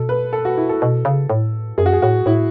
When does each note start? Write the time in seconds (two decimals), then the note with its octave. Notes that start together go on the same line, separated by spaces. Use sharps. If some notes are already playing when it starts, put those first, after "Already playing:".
Already playing: B2 A4
0.09 B4
0.33 A4
0.45 F#4
0.57 E4
0.69 A4
0.82 B2
1.05 C#3
1.30 A2
1.78 F#2 G#4
1.86 F#4
1.93 G#4
2.02 A2 F#4
2.26 A2 E4